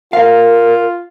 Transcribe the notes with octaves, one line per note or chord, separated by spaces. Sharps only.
F4 A#4 F5